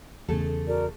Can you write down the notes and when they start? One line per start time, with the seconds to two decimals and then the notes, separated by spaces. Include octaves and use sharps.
0.29 E2 C#3 A3 G#4 A4
0.67 F#4 A#4 D5